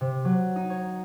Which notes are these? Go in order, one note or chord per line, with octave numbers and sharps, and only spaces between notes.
C3
F#3
D#4
C#5